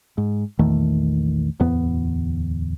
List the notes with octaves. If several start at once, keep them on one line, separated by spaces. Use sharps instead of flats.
G#2
A#1 E2 D#3 A3
D1 E2 B3